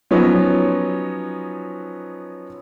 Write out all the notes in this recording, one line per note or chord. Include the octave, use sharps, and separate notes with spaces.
F3 F#3 B3 C#4 D#4